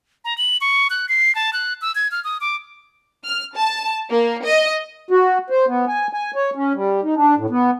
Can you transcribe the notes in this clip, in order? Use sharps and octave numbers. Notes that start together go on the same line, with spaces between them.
A#5
F#7
C#6
F#6
C7
A5
F#6
E6
G#6
F6
D#6
D6
F6
A5
A#3
D#5
F#4
C5
B3
G#5
G#5
C#5
C#4
G3
D#4
D4
A2
B3